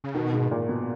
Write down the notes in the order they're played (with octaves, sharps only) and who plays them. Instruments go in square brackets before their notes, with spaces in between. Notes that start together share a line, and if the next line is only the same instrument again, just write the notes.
[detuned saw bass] C#3
[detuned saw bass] B2 [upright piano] D#3
[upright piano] G#2
A#2
B2